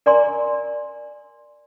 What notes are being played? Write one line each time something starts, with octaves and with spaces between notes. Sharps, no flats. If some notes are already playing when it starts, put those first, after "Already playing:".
A#4 D5 G#5 A#5 C6